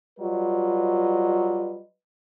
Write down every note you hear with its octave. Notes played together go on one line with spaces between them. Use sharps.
F#3 G3 F4 B4 D#5